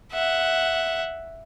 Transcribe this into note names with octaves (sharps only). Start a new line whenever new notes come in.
E5 F#5